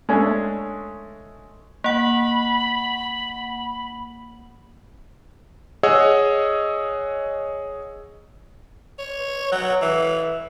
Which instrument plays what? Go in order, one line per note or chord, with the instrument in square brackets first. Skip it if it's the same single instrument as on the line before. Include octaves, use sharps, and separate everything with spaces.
[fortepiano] G#3 A3 C#4 D4 A4 C#5
[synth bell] A#3 F#5 [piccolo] B5
[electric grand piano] G#4 C#5 D#5 F#5 E6
[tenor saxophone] C#5
F#3
E3